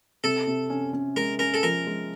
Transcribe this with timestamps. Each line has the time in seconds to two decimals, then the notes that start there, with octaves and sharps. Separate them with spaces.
0.24 C3 A4
0.47 C3
0.70 C#4
0.93 C#4
1.16 G#3 A#4
1.39 C#4 A#4
1.54 A4
1.63 F3 A#4
1.87 G#3